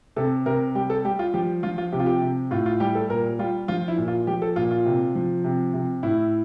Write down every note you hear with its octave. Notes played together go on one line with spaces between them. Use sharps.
C3 A4
C3 A#4
G3 G4
A4
G3 G4
F4
F3 G4
F3 F4
F4
C3 G4
F4
G4
C3
A2 F4
F4
G3 G4
A4
A#2 A#4
G3 F4
F3 F4
E4
A#2
F4
F3 G4
A4
A#2 F4
F4
C3
F3
C3
C3
A2 E4